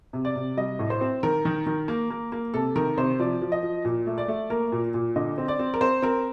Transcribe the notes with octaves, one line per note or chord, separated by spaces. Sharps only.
C3
D5
C3
G3 D#5
A2
C5
C4
D#3 A#4
D#3
D#3
A#3
A#3
A#3
C3 A4
D#3 A#4
C3 C5
F3 D5
F3
D#5
F3
A#2
A3
D5
A3
A#3 A#4
A#2
A#2
D3 D#5
C4
D5
C4
A#4
C4 C5
C4 A#4